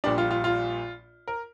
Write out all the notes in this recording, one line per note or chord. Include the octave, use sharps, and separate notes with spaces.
A#1 A#2 G3 D4
F4
F4
F4
A#4